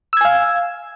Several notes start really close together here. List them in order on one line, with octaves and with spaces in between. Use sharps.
E6 G#6 G#5 F5